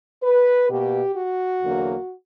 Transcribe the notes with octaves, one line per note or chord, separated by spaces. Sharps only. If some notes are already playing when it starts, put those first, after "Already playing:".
B4
B2 A#3 G4
F#4
E2 D3 F#3 A#3